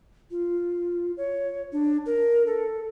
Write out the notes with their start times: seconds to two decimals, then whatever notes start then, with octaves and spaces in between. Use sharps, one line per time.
0.31 F4
1.17 C#5
1.73 D4
2.06 A#4
2.46 A4